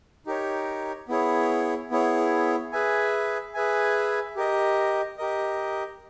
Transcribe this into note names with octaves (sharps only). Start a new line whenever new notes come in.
D#4 G4 A#4 C#5
B3 E4 G#4 C#5
B3 E4 G#4 C#5
G#4 B4 E5 G#5
G#4 B4 E5 G#5
G4 A#4 D#5
G4 A#4 D#5